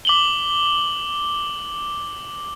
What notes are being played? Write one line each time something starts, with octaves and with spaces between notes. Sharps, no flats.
D6 F#7 G7